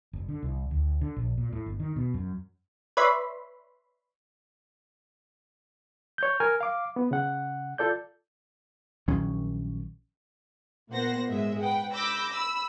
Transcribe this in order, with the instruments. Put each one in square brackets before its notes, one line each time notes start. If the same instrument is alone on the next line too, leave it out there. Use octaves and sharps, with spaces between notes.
[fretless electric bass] F#1
D3
C2
D2
D3
A#1
A#2
A2
G1
D#3
B2
F#2
[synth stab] B4 C#5 D5 E5 B5 C6
[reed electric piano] C#5 G6
A#4 G#5 F6
F5 D6
B3
C#3 F#5
F4 A4 D5 G6
[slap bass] A#1 D#3 F#3 C#4
[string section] A#2 A#3 B3 C5 F#5 A#6
G#2 G#3 E5
B4 F#5 G5
B5 D6 E6 G6 A#6
B5 E6